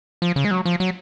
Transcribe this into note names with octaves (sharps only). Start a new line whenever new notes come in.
F3
C#3
G#3
F#3
F3
F#3